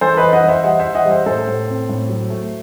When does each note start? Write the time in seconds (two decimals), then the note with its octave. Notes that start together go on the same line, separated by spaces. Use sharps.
0.01 E3 A4 C5
0.17 B4 D#5
0.23 E3
0.33 D#5 F#5
0.43 E3
0.49 C5 E5
0.64 G3 D#5 F#5
0.79 C5 E5
0.85 E3
0.95 D#5 F#5
1.05 G3
1.11 C5 E5
1.26 A2 A4 C5
1.47 A2
1.68 C4
1.89 A2
2.09 F#3
2.30 A3